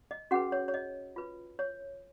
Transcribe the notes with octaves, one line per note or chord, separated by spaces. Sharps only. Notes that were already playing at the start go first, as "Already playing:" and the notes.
D#5
C#4 F#4 G#4 B4 F#5
C#5
C#5
D#5
F4 B4
C#5